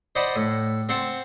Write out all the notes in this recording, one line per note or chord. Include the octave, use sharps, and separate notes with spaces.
C5 D5 D#5 F#5 A5 B5
A2
C4 C5 F#5 A5